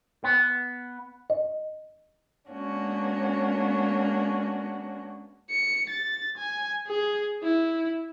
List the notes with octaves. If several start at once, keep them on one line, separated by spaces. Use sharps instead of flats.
B3
D#5
G#3 A#3 B3 C#4 D4 F#4
C#7
A6
G#5
G#4
E4